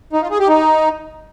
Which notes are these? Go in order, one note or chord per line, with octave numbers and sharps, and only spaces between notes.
D#4
F4
G#4
G4
D#4